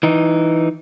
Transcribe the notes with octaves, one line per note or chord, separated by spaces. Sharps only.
E3 D#4